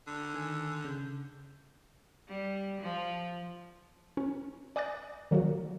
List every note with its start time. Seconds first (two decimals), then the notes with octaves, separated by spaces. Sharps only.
0.07 D3
0.34 D#3 G#5 E6
0.85 C#3 G6
2.28 G3
2.81 F3
4.17 C#4
4.76 D5 G#5 D6 D#6 F#6 A6
5.31 D#3 F#3 A#3 F#4